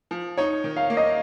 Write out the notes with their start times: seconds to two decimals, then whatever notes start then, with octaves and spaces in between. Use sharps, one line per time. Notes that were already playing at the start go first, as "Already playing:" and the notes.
0.11 F3
0.37 D#4 C#5
0.64 D#3
0.77 F5
0.90 A#3
0.97 D#5